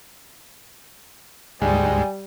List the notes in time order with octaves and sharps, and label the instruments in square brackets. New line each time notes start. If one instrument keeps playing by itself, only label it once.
[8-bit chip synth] D2 G#2 G#3 [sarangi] G3 [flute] G#5